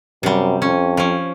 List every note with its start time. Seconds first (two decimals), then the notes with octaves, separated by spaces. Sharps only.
0.23 F#2 C3 G3
0.62 F2 C#4
0.97 F3 C#4